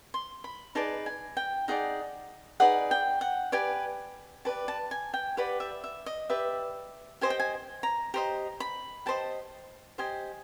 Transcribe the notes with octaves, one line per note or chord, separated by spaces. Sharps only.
C6
B5
D#4 G#4 B4 D5 A5
G#5
G5
D#4 G#4 B4 D5 F#5
D#4 G#4 B4 D5 F#5
G5
F#5
G4 B4 D5 G#5
G4 B4 D5 A5
A5
G#5
G5
G4 B4 D5 F#5
E5
E5
D#5
G4 B4 D5 E5
G4 C5 D#5 G#5
G5
G#5
A#5
G4 C5 D#5 A#5
B5
G4 C5 D#5 A5
G4 C5 D#5 G#5